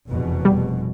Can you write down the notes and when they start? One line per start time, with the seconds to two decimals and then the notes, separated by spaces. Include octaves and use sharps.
0.10 F1 E2 B2
0.45 G3